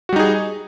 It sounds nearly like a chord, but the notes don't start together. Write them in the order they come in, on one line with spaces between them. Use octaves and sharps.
F#4 G3 D#4 G#4